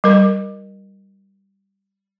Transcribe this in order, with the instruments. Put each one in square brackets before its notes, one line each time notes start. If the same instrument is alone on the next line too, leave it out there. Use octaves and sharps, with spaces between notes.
[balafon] G3 A#4